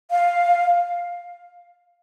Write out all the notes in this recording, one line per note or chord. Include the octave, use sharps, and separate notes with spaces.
F5